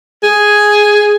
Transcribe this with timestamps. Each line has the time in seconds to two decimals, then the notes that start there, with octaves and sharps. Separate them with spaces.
0.23 G#4